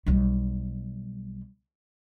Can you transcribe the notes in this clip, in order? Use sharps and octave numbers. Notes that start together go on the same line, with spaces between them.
B1 G3